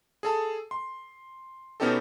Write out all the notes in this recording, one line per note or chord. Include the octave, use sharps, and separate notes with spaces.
G#4 A4 A5
C6
B2 B3 C#4 D#4 G4 A4